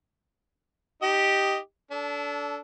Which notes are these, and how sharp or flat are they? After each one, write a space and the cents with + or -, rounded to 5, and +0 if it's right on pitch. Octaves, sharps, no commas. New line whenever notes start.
D#4 +0 G4 +0 D#5 +0
D4 -30 A4 -5